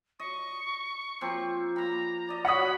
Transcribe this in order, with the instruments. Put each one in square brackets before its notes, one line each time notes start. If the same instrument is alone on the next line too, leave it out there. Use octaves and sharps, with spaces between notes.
[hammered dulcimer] D#5 [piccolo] C#6
[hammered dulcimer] F3 A#3 C4
[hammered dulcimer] A#3 B5 [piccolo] A#5
[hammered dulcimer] D5 D#5
[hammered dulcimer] F#4 C#5 D#5 [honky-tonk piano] F#5 D#6 [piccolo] B5